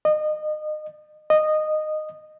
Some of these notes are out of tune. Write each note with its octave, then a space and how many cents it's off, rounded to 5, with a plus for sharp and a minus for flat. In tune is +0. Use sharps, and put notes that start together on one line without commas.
D#5 -30
D#5 -15